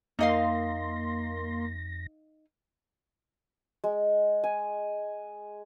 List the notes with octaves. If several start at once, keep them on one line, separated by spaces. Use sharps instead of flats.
F2 A#3 D#4 D#5 F5 C6 A#6
G#3
G#5